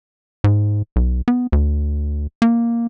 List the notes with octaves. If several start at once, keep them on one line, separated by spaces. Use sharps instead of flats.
G#2
B1
B3
D2
A#3